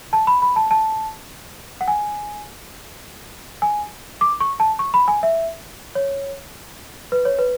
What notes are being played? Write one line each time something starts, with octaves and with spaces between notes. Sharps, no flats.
A5
B5
B5
A5
A5
F#5
G#5
G#5
D6
C#6
A5
C#6
B5
G#5
E5
C#5
B4
C#5
B4